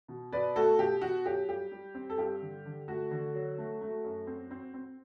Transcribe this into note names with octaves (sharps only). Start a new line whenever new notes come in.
B2
B2 B4 D5
A3 F#4 A4
B2 G4
B2 F#4
F#3 G4
G3 G4
G3
C4
A4
G2 G4
D3
D3
A3 F#4
D3
F#3
A3
A3
F#2
C4
C4
C4